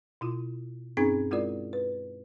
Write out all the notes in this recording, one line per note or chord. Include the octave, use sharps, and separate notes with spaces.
B2 E4 F4
G2 C4 C#4 D#4 G#4 G#6
G#3 E4 F4 A#4 D5
B4